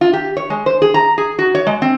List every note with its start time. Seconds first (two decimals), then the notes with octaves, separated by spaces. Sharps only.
0.01 F4
0.13 G4
0.37 C#5
0.50 G#3
0.66 C5
0.82 G#4
0.94 A#5
1.18 G#4
1.39 F#4
1.55 C#5
1.66 G#3
1.82 C4